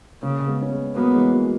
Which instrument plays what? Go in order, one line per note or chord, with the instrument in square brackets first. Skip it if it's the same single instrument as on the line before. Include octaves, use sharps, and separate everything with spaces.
[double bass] C#3 [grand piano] A#3 C#4
[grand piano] G#3 B3
C#4
G#3 B3
[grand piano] F#3 A#3 [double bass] B3
[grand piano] E3 G#3
F#3 A#3